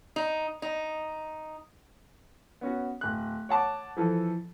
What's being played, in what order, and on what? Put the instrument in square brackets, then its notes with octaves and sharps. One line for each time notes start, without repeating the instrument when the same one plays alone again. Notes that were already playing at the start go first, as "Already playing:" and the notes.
[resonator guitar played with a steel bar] D#4
D#4
[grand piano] B3 C#4 F#4
D1 F#6
C#5 F#5 A5 D6
E3 F3 A4